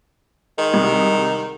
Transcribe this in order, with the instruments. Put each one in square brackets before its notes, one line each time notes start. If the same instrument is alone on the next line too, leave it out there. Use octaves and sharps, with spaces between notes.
[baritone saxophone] D#3 [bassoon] G#3
[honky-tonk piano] C2